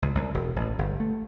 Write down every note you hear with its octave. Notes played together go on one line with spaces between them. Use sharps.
C#2
C2
E1
A1
G1
A3